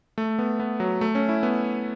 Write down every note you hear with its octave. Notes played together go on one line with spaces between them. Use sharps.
A3
B3
B3
F#3
A3
C#4
E4
B3